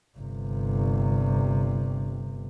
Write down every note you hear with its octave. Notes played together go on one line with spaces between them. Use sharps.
G1 C3